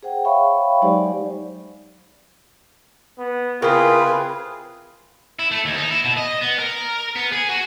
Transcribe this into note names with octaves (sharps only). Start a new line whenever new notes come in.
G#4 C5 F#5 G5
C#5 E5 F5 G5 B5 C#6
F#3 G#3 D#4 G4 C5 D5
B3
C#3 C4 E4 F4 G#4 A#4 B4
E4
A3
D#2
D#4
E4
B2
D#5
B3
A#4
B3
G#4
F#4